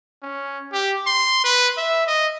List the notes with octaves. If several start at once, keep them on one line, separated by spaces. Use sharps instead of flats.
C#4
G4
C6
B4
E5
D#5